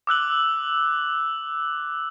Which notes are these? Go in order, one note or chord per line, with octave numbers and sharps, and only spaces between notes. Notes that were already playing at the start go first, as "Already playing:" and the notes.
D6 E6 F#6 F#7